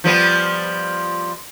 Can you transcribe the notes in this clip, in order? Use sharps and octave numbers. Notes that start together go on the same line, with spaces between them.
F3 G3 B3